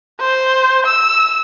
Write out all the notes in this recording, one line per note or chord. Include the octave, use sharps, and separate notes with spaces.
C5
E6